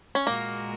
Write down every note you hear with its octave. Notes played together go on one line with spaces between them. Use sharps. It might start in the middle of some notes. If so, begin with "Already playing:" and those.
C#4
A#2 G#3 A#3 F#4 A#4